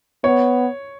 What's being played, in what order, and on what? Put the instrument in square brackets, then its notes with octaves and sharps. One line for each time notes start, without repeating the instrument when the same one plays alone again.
[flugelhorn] B3 [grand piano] C#5